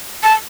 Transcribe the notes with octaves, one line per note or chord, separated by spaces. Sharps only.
A5